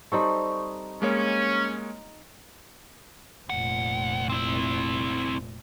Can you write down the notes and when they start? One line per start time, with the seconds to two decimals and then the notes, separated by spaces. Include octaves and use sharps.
0.12 G3 C4 D#4 A4 B5 C#6
1.02 G#3 A#3 C#4 C#5
3.49 F1 D2 A#2 F#5
4.29 C4 E4